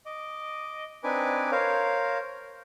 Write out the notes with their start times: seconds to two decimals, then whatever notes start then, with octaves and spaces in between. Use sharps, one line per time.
0.06 D#5 D6
1.04 C4 D4 D#4 B4 G#5 D6
1.52 A#4 C5 C#5 F5